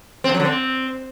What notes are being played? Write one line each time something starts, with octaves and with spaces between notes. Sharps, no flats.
C4
D3
F#3
D3
C4